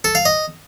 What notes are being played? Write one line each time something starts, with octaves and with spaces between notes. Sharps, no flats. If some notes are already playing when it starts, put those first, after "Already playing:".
A4
F5
D#5